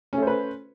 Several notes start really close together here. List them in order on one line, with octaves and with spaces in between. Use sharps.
C#4 A3 C5 B4